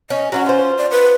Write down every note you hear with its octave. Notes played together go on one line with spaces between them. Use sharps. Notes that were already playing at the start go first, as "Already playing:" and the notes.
C#4 D#5
F#3 C#4 F4 F#4
F4 C5
D5
B4